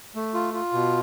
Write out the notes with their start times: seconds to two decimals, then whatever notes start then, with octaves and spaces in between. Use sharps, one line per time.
0.15 A3
0.34 F4
0.54 F4
0.73 B2